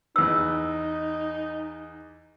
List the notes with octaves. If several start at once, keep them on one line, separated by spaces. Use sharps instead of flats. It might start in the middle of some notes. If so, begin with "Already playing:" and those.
E2 D#4 B4 E6